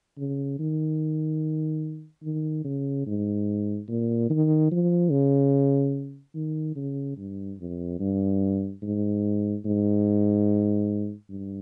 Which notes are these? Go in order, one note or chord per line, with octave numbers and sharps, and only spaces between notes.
C#3
D#3
D#3
C#3
G#2
A#2
D#3
F3
C#3
D#3
C#3
G2
F2
G2
G#2
G#2
G2